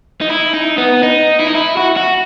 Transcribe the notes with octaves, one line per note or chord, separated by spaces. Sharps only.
D#4
E4
D#4
B3
D#4
E4
D#4
E4
F#4
F#4